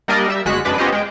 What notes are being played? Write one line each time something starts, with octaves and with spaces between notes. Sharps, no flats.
G3 A#3 D4 A#4 D5 D#5
G3 E5 E6
G1 G#3 F#4 F#6 B6
F#2 G#3 D4 B4 D6
B3 C#4 F4 G4 C5 D#5
G#3 G5